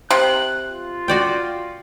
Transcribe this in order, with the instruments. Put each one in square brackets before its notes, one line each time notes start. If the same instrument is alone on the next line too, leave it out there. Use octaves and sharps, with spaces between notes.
[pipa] C3 [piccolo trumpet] F#6
[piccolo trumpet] F4
[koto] F#4 D5 G5